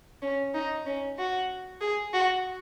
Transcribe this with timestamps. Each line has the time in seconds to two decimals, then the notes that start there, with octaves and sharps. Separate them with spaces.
0.22 C#4
0.55 D#4
0.86 C#4
1.18 F#4
1.81 G#4
2.13 F#4